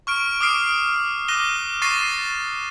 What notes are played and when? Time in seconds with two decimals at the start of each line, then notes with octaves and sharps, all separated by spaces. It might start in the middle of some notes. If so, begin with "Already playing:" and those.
0.07 C#6 F6 D7
0.41 D6 D#6 F6 C7 D7
1.28 D6 F#6 A#6 D#7 G7
1.82 C#6 A6 A#6 C7 D#7